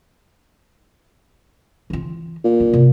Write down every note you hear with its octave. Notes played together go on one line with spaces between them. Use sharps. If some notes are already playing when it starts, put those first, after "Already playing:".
E3 F4
A#2
D4 D#4
C3